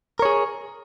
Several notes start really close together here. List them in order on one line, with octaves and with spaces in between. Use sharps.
A#4 C#5 G#4